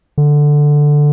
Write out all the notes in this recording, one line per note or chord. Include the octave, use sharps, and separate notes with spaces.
D3